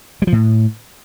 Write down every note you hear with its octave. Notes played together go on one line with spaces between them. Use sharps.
G3
F3
A2